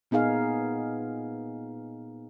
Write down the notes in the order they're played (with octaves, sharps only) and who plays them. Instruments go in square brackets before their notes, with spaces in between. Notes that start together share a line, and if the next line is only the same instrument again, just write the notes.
[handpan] A#2 B3 D#4 G#4 F5